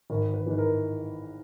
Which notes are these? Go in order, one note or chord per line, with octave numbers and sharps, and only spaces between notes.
G#1 A#4
B4
G#2 E3 B4
A#4